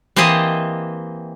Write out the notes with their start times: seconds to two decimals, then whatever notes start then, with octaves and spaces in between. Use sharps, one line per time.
0.16 E3 A#3 C4 G4 D#5 A5